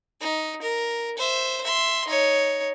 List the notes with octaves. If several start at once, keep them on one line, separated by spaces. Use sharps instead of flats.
D#4
A#4
C5 E5
E5 C6
D#4 C#5